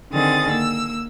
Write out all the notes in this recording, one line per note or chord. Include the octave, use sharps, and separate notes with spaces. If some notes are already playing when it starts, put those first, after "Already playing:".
D3 D#3 C4 G#4 D#6 A6
A#3 E6